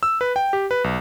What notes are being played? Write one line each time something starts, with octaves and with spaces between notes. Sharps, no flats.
E6
B4
G5
G4
B4
B1